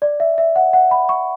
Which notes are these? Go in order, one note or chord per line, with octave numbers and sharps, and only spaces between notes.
D5
E5
E5
F#5
F#5
B5
C#6